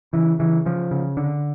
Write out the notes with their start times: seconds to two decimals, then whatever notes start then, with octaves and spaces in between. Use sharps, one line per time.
0.13 C#3 E3
0.39 C#3 E3
0.66 C#3 F3
0.91 C#3
1.17 D3